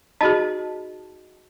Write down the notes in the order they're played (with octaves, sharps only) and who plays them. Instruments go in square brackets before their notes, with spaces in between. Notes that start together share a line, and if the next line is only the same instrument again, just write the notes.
[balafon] D#4 F#4 G#4 [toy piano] D#5 A5